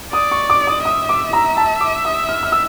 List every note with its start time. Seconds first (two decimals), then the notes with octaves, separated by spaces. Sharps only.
0.13 D5 D#6
0.32 C#6
0.50 D6
0.67 D#6
0.85 E5 D#6
1.09 D6
1.33 A#5
1.57 A5
1.81 D6
2.05 D#6
2.29 F6
2.43 F6
2.52 E6